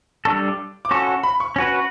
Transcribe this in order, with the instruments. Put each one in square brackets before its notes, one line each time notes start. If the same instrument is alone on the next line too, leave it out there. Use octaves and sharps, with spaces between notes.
[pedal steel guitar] G3 D4 A4 [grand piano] C#6
[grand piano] D6
D6
[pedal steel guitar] C#4 F#4 A4 [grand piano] C#6
[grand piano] C#6
B5
C#6
[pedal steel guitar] C#4 F#4 B4